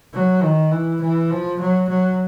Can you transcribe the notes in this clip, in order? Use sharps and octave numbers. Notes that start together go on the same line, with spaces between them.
F#3
D#3
E3
E3
F3
F#3
F#3